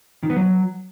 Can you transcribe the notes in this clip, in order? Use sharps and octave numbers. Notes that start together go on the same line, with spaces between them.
D#3
B3
F#3